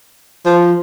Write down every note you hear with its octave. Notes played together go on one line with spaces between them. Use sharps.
F3